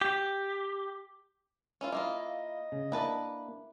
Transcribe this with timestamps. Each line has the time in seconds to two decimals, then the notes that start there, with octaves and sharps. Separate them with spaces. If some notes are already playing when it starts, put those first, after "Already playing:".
0.01 G4
1.81 C#4 E4 F4
1.92 A#3 E4 F4 D#5
2.72 C#3
2.92 A#3 D4 E4 B4 A5